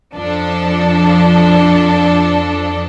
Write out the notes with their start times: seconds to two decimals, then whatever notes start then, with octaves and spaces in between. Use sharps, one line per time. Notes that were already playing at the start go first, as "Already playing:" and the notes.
0.14 F2 F3 D4 A4